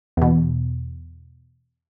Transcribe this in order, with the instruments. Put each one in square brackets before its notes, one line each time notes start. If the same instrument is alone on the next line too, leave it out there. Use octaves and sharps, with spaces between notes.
[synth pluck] E2 B2